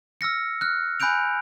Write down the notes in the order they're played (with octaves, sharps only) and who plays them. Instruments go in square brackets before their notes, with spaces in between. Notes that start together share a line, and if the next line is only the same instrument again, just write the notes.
[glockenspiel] E6 F6 A#6 C#7
F6 F#6
G#5 B5 F#6 G6 D7 F7